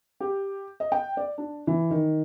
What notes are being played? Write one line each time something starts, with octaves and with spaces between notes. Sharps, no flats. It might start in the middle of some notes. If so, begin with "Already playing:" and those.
G4
D#5
G5
D5
D4
E3
D#3